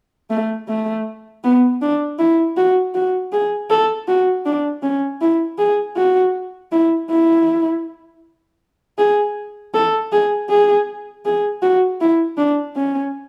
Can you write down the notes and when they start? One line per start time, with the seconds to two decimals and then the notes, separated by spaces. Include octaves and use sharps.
0.30 A3
0.68 A3
1.44 B3
1.82 D4
2.19 E4
2.57 F#4
2.95 F#4
3.33 G#4
3.70 A4
4.08 F#4
4.45 D4
4.83 C#4
5.21 E4
5.58 G#4
5.97 F#4
6.72 E4
7.10 E4
8.98 G#4
9.74 A4
10.12 G#4
10.49 G#4
11.25 G#4
11.63 F#4
12.01 E4
12.38 D4
12.76 C#4